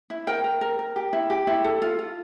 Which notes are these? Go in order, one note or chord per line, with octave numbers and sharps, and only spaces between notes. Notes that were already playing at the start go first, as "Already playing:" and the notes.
E4
A#4 G5
A#4
A#4
A#4
G4
E4
G4
E4
A4
F4
F4